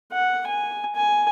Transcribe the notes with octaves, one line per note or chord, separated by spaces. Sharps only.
F#5
G#5
G#5